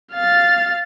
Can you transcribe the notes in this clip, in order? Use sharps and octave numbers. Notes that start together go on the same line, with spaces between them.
F5 A6